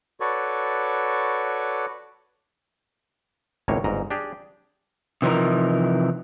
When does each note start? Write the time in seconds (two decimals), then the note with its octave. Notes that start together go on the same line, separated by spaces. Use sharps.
0.20 F#4 A4 B4 C#5 D5
3.68 G#1 C#2 A2 A#3 C#5
3.84 G1 G#2 A#5
4.11 D4 G4 G#4
5.22 C3 E3 F3 D#4 A#4